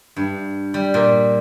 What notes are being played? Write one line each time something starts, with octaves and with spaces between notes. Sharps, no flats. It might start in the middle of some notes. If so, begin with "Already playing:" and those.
G2
G3
A#2